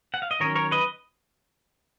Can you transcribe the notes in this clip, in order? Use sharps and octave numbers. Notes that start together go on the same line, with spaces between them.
F#5
F5
D#5
D#3 F#3 C#4 A#4 C#5
A#4 C#5
B4 D#5